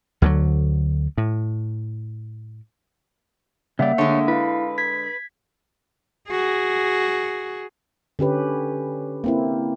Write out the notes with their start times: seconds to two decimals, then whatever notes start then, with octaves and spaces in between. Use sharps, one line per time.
0.22 D2 D3 E3 F#3
1.18 A2
3.79 C#3 G3 A#3 D5 E5 F#5
3.98 D3 G#3 A3 C#5
4.28 E4 B4 F5
4.78 G#6 B6
6.30 F#4 G#4
8.19 D3 C#4 G4 B4
9.24 A#3 C4 E4